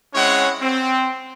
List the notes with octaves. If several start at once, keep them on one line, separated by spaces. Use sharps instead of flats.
G#3 C4 C#4 E4 C#5 F#5
C4